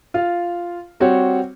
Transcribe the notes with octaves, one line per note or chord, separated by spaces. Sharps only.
F4 F5
G3 C4 F#4 G4 C#5